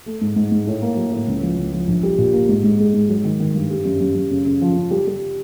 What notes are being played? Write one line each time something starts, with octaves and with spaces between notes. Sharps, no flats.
A3
G#2
G#2
G#2
A2
A#3
F#3
A2
C#2
F3
C#2
F3
A#1
G3
A#2
A#3
G#2
G#2
G#3
G#2
F#3
D#3
D#3
G2
G3
F#2
F#2
F#2
C#3
C#3
F3
C#3
G3
G3